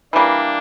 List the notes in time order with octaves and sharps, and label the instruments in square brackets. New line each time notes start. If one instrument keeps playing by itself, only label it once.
[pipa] E3 G3 A#3 [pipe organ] D4